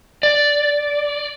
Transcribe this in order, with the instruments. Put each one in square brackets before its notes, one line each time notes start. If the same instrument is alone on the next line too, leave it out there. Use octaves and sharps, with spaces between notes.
[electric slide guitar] D5